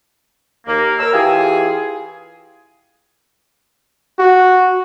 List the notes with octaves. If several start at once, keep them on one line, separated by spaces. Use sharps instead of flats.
D#2 A#3
A#4 C#5 A#5 E6
E3 F4 G4 G#4
F#4